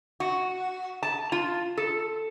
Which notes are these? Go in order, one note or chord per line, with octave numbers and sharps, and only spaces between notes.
F#4
A5
F4
A4